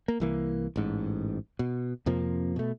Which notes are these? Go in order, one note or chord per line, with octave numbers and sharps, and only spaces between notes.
A#3
C2 E3 A#3
A1 G#2
B2
F2 C3 F3 A#3
B2 A3